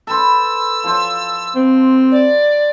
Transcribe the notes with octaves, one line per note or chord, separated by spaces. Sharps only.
A4 B4 C5 E6
F3 C5
C4
D5